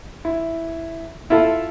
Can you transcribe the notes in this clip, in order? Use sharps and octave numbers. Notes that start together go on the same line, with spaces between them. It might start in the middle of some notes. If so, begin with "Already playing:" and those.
E4
E4 F4 A4 E5